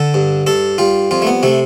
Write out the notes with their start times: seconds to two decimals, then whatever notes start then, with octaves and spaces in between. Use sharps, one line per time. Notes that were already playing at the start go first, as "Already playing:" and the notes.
Already playing: D3 A4
0.14 G2
0.47 G2 A4
0.78 G3 F4
1.11 F2 F4
1.22 A3
1.27 B3
1.43 C3 A3